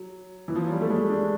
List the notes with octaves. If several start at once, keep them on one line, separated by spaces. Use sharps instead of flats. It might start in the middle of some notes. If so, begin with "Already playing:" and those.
Already playing: F#3
E3
F3
F#3
G3
A3
G#3
D4